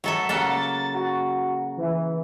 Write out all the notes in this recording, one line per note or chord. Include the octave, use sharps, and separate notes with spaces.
F#3 A4 E5
C#3 A#3 A4 F#5
A6
F#4
E3